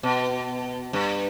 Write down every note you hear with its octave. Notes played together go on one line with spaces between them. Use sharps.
B2
G2